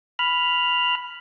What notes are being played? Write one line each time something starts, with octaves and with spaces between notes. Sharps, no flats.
B5 F6